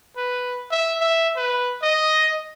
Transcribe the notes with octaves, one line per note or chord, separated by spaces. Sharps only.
B4
E5
E5
B4
D#5